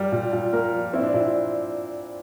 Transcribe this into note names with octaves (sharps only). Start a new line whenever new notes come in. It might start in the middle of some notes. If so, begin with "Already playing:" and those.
Already playing: G3 A#4
A#2
A#2
A#3 A#4
F3
C4 E4
D4
A#2 E4